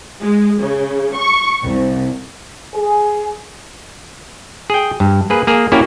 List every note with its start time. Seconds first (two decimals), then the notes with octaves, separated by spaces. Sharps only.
0.22 G#3
0.61 C#3
1.14 C#6
1.63 C2
2.74 G#4
4.70 G#4 G5
5.00 G2
5.30 A#3 G#4 B4
5.47 A#3 G#4
5.72 A#3 C#4 E4 F#4 G4